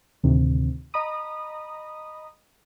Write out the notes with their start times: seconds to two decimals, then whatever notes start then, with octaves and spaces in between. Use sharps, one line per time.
0.23 D2 A2 C3 D#3
0.94 D#5 A#5 B5 D#6